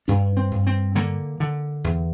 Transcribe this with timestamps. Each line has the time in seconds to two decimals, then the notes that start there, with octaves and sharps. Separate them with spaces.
0.08 G2 D4
0.37 C4
0.51 G2
0.67 C4
0.95 D3 A#3
1.40 D3
1.84 E2